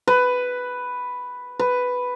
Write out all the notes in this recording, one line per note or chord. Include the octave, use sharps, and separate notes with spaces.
B4
B4